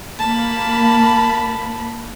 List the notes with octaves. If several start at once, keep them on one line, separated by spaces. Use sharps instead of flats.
A#3 A5 B5